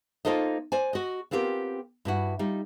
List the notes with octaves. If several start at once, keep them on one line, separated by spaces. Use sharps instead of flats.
A#3 D#4 F4 A4 C5 D#5
C5 D5 G#5
F#4 D#5
B3 C4 F4 G4 A#4
G2 E4 F#4
G3 D#4 F4